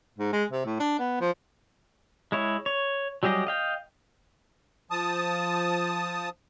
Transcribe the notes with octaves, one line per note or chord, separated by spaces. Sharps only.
G#2
G#3
C3
A2
D4
B3
F3
G#3 E4 C#5
C#5
F#3 G3 G4 G#4 D#5
D#5 F5 G5
F3 A5 D#6